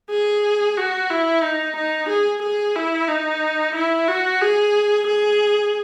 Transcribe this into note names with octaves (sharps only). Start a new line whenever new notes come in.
G#4
F#4
E4
D#4
D#4
G#4
G#4
E4
D#4
E4
F#4
G#4
G#4